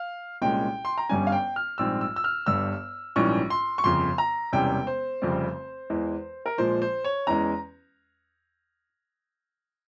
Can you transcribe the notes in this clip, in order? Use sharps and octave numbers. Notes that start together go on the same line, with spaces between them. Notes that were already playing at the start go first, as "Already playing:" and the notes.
Already playing: F5
C2 A#2 G#3 C#4 G5
C6
A#5
G1 G2 G3 C#4 G#5
F5
G5
F6
A#1 G#2 G3 C4 E6
E6
E6
F6
G1 G2 G3 E6
A#1 G#2 E3 G3 C#4 C#6
C6
C#6
G1 F2 C#3 C6
A#5
E1 E2 C3 G3 C#4 G5
C5
F1 F2 C#3 G3 C4
E2 E3 G#3
A#4
A#1 A#2 F3 G#3 C5
C5
C#5
E2 E3 G#3 C#4 A#5